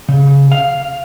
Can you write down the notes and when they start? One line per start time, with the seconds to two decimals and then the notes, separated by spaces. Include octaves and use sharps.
0.09 C#3
0.52 F5